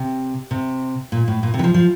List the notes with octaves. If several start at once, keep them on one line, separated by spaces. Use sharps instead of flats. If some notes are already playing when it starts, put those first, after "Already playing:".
Already playing: C3
C3
A#2
A2
A#2
C3
E3
F3
F3